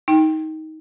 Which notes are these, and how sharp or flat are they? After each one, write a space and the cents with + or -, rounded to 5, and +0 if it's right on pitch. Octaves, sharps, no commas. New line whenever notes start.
D#4 +20 G5 +5